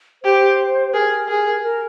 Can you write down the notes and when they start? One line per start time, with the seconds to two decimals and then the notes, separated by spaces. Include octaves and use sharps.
0.23 G4 C5
0.93 G#4 A#4
1.28 G#4
1.63 A#4